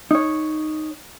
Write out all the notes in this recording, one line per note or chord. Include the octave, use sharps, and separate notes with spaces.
D#4 C#5